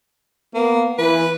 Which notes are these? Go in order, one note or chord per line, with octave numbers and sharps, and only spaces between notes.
A#3 B3
E3 B4